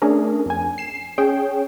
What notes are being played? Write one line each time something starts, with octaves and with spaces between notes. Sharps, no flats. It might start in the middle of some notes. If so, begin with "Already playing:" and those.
A3 C#4 D4 G#4 A#4
F2 G#5
C7 E7
C#4 G#4 C#5 G5